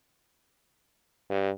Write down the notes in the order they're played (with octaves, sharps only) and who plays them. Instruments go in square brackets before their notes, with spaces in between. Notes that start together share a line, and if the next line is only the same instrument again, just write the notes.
[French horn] G2